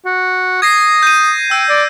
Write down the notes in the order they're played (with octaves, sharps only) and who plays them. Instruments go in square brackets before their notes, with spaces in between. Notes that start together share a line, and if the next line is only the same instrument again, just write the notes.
[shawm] F#4
[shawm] D#6 [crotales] G#6 A#6 C7
[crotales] G6 D#7
[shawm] G5 [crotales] E6
[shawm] D5